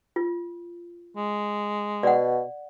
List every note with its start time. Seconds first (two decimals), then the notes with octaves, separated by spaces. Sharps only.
0.16 F4
1.17 G#3
2.03 B2 D5 F#5